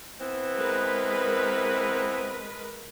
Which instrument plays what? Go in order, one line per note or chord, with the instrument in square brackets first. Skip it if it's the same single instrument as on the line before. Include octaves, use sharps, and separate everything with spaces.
[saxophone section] E3 B3 C4
[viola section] G#3 A#4 B4